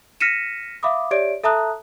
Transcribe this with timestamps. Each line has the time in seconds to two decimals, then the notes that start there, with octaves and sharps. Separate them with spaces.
0.20 F6 A#6 B6 C#7 D#7 E7
0.83 E5 F5 B5 D6 D#6
1.11 G4 C#5 D5 E5 D7
1.44 A4 E5 A5 A#5 D#6 F#6